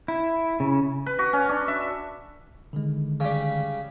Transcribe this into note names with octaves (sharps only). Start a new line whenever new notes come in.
E4
C#3
B4
F#4
C#4
D4
E5
D3 D#3 G#3
C#3 G3